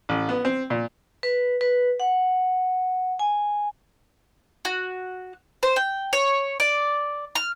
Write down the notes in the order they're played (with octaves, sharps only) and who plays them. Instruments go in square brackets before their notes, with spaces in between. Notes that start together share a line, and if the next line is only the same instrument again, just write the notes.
[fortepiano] A1
B3
C4
A#2
[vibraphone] B4
B4
F#5
G#5
[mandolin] F#4
C5
G5
C#5
D5
F6